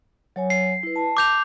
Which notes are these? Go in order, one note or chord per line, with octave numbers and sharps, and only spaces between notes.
F#3 C#5 G#5
C7
E4 B4
A5
D6 G6 F7